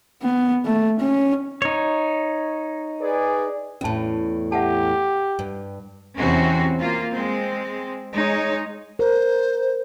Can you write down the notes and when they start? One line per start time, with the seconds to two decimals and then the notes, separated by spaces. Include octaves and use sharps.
0.22 B3
0.66 A3
1.00 C#4
1.62 D#4 C#5
3.01 G#4 B4 D5
3.81 E2 A2 C#4 A5
4.52 G4 E5 F#5 A5
5.39 G2
6.17 E2 C3 E3 C4 C#4 F#4
6.76 A#3 F4
7.13 G#3 C4
8.14 G#3 D#4 C#5
8.99 A#4 C5